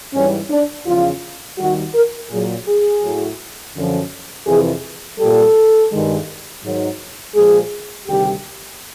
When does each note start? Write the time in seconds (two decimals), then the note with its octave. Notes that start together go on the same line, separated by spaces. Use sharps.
0.14 G#2 E3 G3 C#4
0.50 D4
0.86 E2 C#3 F3 F4
1.58 D#2 D#3 G3 F#4
1.95 A#4
2.30 A#2 F#3 G#4
2.67 G#4
3.03 A2 F#3
3.75 F#2 D3 F3
4.47 F2 C3 E3 G#4
5.19 A#2 G3 A4
5.91 G2 D#3 G#3
6.63 G#2 D#3 F#3
7.35 A#2 F3 G#3 G#4
8.08 D2 C3 D#3 G3 G4